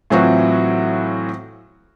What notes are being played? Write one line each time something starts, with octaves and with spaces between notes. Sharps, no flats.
A2 E3 F#3 C4 F4 F#4